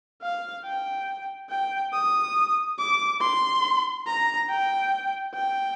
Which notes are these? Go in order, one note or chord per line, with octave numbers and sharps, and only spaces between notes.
F5
G5
G5
D#6
D6
C6
A#5
G5
G5